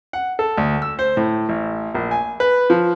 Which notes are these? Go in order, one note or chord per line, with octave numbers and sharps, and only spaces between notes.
F#5
A4
D2
E6
C5
A2
A1
A#1
G#5
B4
F3